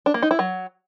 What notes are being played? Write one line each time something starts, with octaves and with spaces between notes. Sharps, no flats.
D4
A#3
D#4
E4
F#3